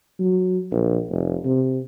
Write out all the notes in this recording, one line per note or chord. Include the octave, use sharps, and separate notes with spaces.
F#3
A#1
F1
C3